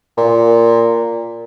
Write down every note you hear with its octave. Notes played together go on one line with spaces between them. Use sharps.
A#2